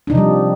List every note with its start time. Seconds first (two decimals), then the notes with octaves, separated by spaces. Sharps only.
0.07 D4
0.10 D#4
0.12 C3
0.15 F3
0.17 G3